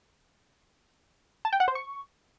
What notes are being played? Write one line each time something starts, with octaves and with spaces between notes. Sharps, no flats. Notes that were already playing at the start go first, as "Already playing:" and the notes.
A5
G5
F#5
C5
C#6